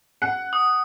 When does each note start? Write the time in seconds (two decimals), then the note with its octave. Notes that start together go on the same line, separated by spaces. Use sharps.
0.22 F#5
0.53 D#6